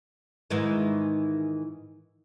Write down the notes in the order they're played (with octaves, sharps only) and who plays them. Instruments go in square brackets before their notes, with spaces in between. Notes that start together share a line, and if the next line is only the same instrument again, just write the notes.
[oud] G#2 D#3 E3